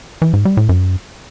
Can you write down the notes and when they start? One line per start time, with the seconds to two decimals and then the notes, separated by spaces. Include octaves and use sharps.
0.22 E3
0.34 G#2
0.45 G3
0.57 A2
0.69 F#2